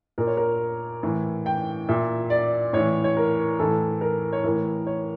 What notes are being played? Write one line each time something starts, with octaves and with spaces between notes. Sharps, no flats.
A#2 A#4
C#5
A#4
A2 E3
G5
A#2 E5
D5
A2 E3 C#5
C#5
A#4
A2 E3 A4
A#4
C#5
A2 E3 A#4
C#5